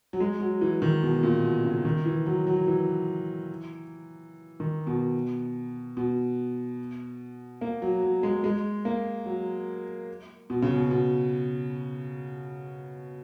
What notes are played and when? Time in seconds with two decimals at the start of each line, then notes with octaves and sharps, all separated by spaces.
0.13 F#3
0.20 G#3
0.41 F#3
0.61 E3
0.82 D#3
1.03 B2
1.23 A#2
1.44 B2
1.65 C#3
1.85 D#3
2.05 E3
2.26 F#3
2.47 F#3
2.68 E3
4.60 D#3
4.87 B2
5.97 B2
7.61 A#3
7.82 F#3
8.03 F#3
8.23 G#3
8.44 G#3
8.85 A#3
9.26 F#3
10.50 B2
10.62 C#3
10.75 B2
10.91 B2